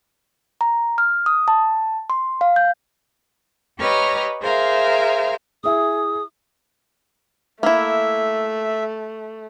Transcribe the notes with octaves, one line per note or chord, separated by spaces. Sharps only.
A#5
F6
D#6
A5
C6
F5
G6
G4 B4 C#5 D#5 A#5 F6
G#4 A#4 C5 E5 F5
E4 G#4 E5 D#6
A3 A#3 E4 E5